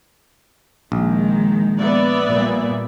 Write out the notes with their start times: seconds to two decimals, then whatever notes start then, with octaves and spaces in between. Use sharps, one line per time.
0.92 A#1 D#3 G#3
1.80 B3 D5 E5
2.29 A#2 G3